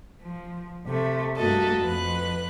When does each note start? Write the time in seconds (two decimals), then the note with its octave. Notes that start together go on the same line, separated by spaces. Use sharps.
0.22 F3
0.86 C3 A3
1.37 G2 A3 A#3 F#4 A4 D#5
1.80 F2 B4 F#6